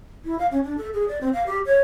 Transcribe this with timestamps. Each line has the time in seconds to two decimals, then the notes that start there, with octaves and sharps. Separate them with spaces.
0.25 E4
0.39 F5
0.51 C#4
0.63 D4
0.78 A4
0.93 G#4
1.08 D5
1.21 C4
1.33 F5
1.46 G4
1.66 C#5